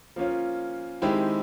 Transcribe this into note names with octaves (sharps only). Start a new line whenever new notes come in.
F3 A#3 C#4 F4
D#3 G#3 C4 E4 G4